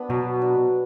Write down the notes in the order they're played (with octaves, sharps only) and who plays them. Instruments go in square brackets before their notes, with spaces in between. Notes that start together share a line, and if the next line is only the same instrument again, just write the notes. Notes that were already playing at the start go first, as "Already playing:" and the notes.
Already playing: [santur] B3 D4
[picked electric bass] B2 [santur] F#3
[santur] D4